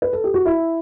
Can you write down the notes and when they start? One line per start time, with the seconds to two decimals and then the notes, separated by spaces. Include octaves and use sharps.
0.02 B4
0.13 A4
0.24 G4
0.34 F#4
0.45 E4